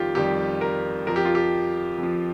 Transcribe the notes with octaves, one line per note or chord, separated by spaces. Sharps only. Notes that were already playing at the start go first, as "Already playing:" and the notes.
Already playing: F2 D#3 G3 F4 G4
F2 D#3 G3 G4
A#4
F2 F3 A#4
G4
F4
G4
F2 F3